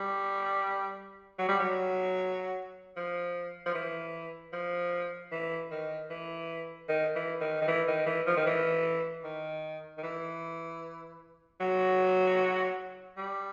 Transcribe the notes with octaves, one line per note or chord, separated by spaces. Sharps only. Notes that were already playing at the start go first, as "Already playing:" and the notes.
Already playing: G3
F#3
G3
F#3
F3
F3
E3
F3
E3
D#3
E3
D#3
E3
D#3
D#3
E3
D#3
E3
F3
D#3
E3
D#3
D#3
E3
F#3
G3